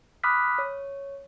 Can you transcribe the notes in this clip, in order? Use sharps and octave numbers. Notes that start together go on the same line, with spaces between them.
B5 D6 D#6 F6 F#6 B6
C#5